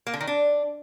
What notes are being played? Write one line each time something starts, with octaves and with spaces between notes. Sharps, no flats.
A#3
D3
D#3
D4